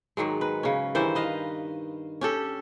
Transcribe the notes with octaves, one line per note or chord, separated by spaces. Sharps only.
G#2 D#3 F#3 G#3
B4
C#3 C#4
G2 D#3 E3 C5
B4 D#5 F5
C#4 G4 A4